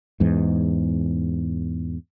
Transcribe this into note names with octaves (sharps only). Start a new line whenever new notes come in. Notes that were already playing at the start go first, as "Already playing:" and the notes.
E2 G#2